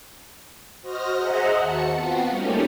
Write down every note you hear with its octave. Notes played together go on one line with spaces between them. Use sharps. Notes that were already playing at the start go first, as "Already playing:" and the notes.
F#4 C5 D#5 F6 A#6
G#4 C5 D#5 E5 F#5 A#5
D#2 F#4 A5 C#7
B3 C4 F4 F#4
G3 A3 A#3 C#4 D#4 G4